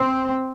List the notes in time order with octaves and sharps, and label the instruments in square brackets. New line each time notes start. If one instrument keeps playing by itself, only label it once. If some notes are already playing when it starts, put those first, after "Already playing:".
Already playing: [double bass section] C4